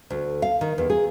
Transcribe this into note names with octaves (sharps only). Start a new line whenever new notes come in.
D2
F5
D#3
E2
G#4